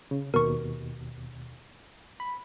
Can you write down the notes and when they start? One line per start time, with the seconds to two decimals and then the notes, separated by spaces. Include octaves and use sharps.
0.11 C#3
0.34 D#2 B2 A#4 C#6
2.20 B5